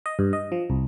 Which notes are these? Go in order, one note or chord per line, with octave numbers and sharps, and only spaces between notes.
D#5
G2
D#5
F3
C2